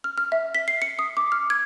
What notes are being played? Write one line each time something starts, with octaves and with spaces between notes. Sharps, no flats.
F6
F6
E5
B6
C7
C#7
D#6
D6
F6
G#6